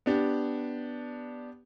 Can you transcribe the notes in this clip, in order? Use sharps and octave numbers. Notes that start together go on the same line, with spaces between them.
B3 D4 G4